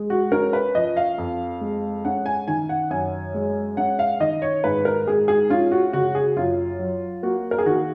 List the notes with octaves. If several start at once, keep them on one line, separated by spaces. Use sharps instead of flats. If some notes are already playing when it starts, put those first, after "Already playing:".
Already playing: G#3
F#4
C#4 A#4
B4
F3 D#5
F5
F2
G#3
C#4 F#5
G#5
D#3 G#5
F#5
F#2 G#5
G#3
C#4 F#5
F5
D#3 D#5
C#5
G#2 B4
A#4
G#3 G#4
G#4
C#4 F4
F#4
C#3 F#4
G#4
F#2 F4
F#3
A#3 F#4
A#4
G#4
D#3 F#4